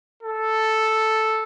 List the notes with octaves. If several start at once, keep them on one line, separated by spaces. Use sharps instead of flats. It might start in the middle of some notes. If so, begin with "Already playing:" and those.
A4